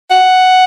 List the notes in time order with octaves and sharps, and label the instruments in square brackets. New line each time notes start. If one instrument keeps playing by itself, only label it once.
[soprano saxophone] F#5